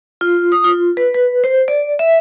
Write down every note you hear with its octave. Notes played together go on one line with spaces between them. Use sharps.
F4
D#6
F4
B4
B4
C5
D5
E5